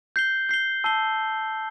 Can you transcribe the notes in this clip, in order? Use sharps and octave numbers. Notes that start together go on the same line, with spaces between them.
G6 C7 G7
G6 C7 G7
A5 E6 C7 G7